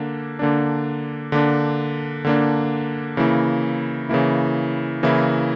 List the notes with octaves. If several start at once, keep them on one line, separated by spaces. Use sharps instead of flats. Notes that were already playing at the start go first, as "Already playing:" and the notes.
Already playing: D3 A#3 D4
D3 A#3 D4
D3 A#3 D4
D3 A#3 D4
C#3 E3 A#3 E4
C#3 E3 A#3 E4
C#3 E3 A#3 E4